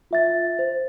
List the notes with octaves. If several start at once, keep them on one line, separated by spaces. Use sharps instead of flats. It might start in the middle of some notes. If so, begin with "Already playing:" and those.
F4 E5 A6
C5